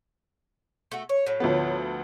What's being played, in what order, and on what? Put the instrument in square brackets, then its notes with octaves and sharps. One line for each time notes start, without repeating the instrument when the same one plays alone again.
[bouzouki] A3 F#4
C#5
A2 F#3
[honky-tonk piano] D2 F3 B3